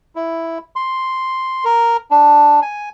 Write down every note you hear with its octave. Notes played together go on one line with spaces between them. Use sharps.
E4
C6
A#4
D4
G#5